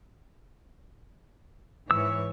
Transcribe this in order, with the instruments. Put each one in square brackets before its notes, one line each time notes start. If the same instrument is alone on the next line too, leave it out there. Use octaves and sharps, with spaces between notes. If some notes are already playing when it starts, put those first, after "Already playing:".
[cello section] G#2 E3 C#5 [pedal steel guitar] E6